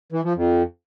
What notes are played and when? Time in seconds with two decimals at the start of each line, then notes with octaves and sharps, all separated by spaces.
0.12 E3
0.24 F3
0.36 F2